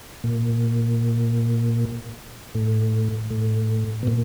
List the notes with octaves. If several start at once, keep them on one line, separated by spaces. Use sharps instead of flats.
A#2
A2
A2
B2
A#2